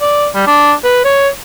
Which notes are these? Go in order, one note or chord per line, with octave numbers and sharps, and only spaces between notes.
D5
G3
D4
B4
C#5